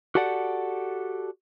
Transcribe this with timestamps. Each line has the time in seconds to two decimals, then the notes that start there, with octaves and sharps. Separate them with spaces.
0.15 F#4 G4 A4 D5 F#5